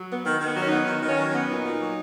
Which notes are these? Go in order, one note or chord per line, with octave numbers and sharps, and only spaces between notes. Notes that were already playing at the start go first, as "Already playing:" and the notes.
Already playing: F#3
B3
D#3 B3
D#3
B3
F#3
C#4
D#4
B3
D#3 D#4
D#3
C#4
F#3
C#4
B3
A#2 D#4
A#2
F#3